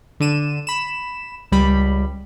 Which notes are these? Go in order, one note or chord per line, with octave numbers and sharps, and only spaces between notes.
D3 D4 D#7 E7
B5 E7
C#2 G3 B5